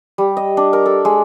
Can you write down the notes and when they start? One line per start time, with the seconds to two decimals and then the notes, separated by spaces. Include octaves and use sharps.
0.18 G3
0.37 D#5
0.57 D4
0.73 A#4
0.86 A4
1.05 G#3